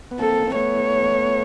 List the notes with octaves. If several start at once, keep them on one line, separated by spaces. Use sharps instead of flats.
B3
A#3 C4 A4
C4
A3 B3 C#5